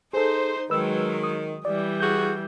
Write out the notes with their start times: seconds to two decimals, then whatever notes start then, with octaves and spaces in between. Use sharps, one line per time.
0.13 D#4 G#4 A4 C5
0.70 D#3 F#3 G#3 B4 E6
1.23 D#6
1.65 E3 G3 D5
2.00 F#4 G#4 G6